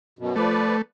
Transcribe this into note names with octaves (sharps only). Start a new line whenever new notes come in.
F#2 B2
F3 A3 B4 D5